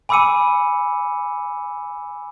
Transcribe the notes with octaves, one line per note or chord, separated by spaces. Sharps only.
G#5 B5 D6 E6 C#7 D#7